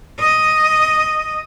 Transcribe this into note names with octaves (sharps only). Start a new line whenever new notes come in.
D#5